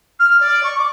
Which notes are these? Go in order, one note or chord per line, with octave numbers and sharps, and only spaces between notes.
F6
D5
C#6
D6